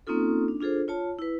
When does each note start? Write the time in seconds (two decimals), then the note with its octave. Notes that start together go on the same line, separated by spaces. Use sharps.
0.07 A#3 C4 C#4 D#4 F4 A4
0.48 D4
0.60 D4 F4 G#4 A4 C5
0.88 F4 C#5 A5
1.19 E4 B4